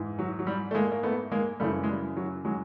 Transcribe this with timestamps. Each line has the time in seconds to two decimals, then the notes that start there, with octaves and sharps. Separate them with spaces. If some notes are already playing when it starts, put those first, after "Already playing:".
Already playing: G#2 E3
0.19 F#3
0.39 F#3
0.47 G3
0.71 A3
0.75 G#3 A#3
0.91 A#3
1.03 A3 B3
1.32 G#3 A#3
1.60 F#2 C#3 E3 G3 A3
1.83 G#3
1.88 G3
2.17 F#3
2.45 F#3 G#3